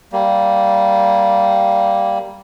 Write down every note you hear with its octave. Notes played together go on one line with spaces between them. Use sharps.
G3 A#3